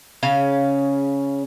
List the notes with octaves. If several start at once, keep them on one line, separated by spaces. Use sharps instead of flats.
C#3 C#4 F5